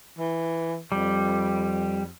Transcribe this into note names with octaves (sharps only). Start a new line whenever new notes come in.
E3
F2 G3